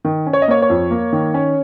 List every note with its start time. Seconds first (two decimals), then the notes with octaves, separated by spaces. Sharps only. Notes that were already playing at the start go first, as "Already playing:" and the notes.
0.05 D#3
0.26 C#4
0.33 C#5
0.42 D#5
0.48 A#3 C#5
0.62 C#5
0.70 F2
0.91 A#3
1.13 D#3
1.34 C#4